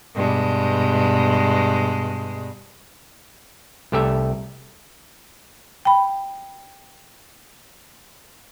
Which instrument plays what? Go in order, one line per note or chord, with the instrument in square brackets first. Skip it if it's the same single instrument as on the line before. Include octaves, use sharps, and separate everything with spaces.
[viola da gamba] G2 B2 G#3
[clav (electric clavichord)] C2 A3 G4 A4 E5
[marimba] G5 B5